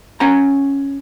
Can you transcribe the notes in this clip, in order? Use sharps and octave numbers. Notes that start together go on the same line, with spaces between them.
C#4 F#5 A#5